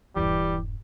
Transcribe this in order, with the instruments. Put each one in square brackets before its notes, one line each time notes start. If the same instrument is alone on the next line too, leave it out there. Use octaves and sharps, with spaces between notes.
[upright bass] D#1 G2 [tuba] E3 [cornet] G3 [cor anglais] G4